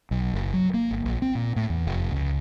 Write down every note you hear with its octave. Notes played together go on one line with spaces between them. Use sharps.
B1
F#1
F#3
A#3
G1
A#1
C4
A#2
A2
E2
F1
C#2